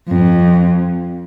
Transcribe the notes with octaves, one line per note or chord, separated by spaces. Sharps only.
F2